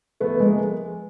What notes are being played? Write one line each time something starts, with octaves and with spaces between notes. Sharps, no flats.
F3 A3 B3
G#3 A#3